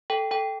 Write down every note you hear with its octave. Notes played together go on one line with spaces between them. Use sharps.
A4 G5
A4 G5